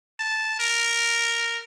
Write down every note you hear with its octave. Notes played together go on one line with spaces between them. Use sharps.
A5
A#4